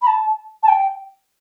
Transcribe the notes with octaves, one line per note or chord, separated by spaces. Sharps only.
B5
A5
A5
G5